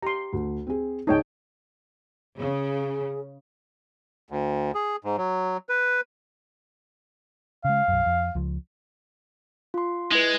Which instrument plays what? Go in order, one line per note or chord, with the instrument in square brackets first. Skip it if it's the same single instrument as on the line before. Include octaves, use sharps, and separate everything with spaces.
[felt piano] G4 [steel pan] A#5 C6
[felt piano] D2
C4 G#4
[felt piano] C#2 G#3 A5 [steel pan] D#4 C#5 G5
[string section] C#3 [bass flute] G#4
[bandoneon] D2
G#4
G#2
F#3
B4
[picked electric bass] C#3 G#3 [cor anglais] F5
[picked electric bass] B1 F#2
F2
C#2 F3
[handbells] F4 C6
[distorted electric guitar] G#3 [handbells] E4 B4